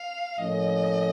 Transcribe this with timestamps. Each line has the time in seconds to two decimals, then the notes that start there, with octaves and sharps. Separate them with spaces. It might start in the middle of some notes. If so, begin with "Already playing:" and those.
Already playing: F5
0.38 A2 F3 A#3 C#4 A4 D#5